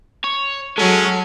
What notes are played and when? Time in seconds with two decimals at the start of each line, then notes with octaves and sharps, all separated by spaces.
0.24 C#5
0.78 F#3 G#3 C#4 A4 A5